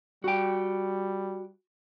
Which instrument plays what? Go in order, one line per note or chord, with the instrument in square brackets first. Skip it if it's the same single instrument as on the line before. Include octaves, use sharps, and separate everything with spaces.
[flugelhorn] G3 [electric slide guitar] F#4 G5